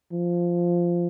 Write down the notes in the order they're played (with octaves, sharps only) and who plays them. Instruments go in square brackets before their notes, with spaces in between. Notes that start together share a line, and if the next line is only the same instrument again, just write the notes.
[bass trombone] F3